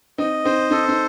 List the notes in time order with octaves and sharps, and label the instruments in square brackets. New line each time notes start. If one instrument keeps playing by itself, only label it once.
[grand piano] C4 D#4 [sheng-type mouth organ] D#5
[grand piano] C4 D#4 [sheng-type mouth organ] C5
[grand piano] C4 D#4 [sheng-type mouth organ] A4
[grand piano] D#4